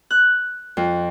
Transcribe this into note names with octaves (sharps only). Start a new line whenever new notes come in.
F#6
F2